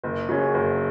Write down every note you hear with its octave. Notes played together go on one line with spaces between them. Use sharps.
F#1
F#2 C#3 F#3 C#4
F#1